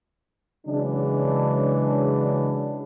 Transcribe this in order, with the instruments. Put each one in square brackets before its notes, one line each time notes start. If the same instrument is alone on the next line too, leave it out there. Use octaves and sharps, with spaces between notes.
[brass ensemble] C#3 E3 F#3 G#3 D4